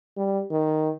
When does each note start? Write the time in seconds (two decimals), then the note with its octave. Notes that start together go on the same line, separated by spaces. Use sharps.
0.17 G3
0.50 D#3